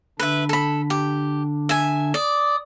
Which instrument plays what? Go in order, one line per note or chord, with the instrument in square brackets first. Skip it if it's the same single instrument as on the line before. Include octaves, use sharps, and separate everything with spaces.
[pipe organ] D3 D4 [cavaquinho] B4 E5
[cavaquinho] A4 B5
G4
E5 G#5
[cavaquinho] D5 [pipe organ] D#6